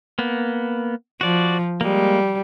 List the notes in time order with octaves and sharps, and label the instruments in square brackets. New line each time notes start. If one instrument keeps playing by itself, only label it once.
[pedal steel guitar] A#3 B3
[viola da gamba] F3 [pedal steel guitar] F#4 D5
[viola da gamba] G3 [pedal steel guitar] G#3 A#3